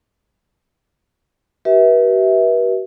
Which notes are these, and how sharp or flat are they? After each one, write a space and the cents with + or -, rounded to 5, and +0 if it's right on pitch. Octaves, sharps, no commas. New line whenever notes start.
G4 -45 B4 -40 E5 -20